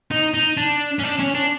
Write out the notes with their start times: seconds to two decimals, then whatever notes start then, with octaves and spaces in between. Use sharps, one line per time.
0.11 D#4
0.34 D#4
0.57 D4
0.99 C#4
1.03 D4
1.19 C#4
1.35 D4